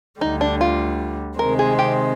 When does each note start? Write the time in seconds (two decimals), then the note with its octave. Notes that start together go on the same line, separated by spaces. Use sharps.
0.20 D2 D3 G3 D#4
0.41 D4
0.61 F4
1.39 C3 D#3 G#3 C4 A#4
1.59 G#4
1.79 G4